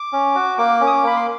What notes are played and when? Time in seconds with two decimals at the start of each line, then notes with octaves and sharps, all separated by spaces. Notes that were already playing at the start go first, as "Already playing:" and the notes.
Already playing: D6
0.13 C#4
0.35 F#4
0.58 A#3 D6
0.81 C#4
0.87 D#6
0.92 D6
1.03 A#3 B5
1.16 C6